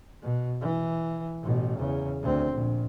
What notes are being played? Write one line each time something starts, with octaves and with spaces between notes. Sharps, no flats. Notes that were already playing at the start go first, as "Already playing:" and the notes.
B2
E3
A1 B2
E2 C#3
D2 C4
A#1